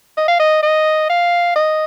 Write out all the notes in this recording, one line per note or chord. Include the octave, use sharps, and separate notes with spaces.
D#5
F5
D#5
D#5
F5
D#5